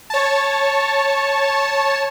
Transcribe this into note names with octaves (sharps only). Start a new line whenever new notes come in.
C#5 A5